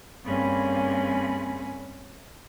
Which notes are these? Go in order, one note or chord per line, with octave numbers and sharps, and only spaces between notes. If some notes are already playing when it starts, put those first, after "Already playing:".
G2 A#3 C4 C#4 G#4 B5